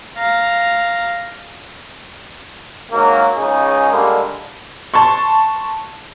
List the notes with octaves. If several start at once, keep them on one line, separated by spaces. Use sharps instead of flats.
F5 A#5
G#2 F#3 A#3
C#2 C#3 D#4 G#4
D3 G3 G#3 A#3
A5 C6 C#6